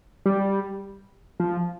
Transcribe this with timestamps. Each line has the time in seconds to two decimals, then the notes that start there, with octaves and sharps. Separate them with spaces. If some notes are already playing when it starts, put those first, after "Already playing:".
0.26 G3
1.40 F3